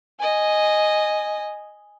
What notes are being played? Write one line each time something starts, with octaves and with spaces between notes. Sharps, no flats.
D#5 G#5